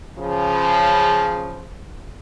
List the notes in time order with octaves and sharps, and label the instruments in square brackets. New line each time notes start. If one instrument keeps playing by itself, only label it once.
[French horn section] C#3 F3